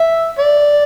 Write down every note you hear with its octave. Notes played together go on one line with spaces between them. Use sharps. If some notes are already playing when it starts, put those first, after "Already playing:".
Already playing: E5
D5